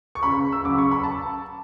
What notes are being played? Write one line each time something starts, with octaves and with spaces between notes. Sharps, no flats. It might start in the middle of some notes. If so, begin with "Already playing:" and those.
C#6
C#2 B5
E6
C#3 F#3 C#4 D6
C#6
B5
A5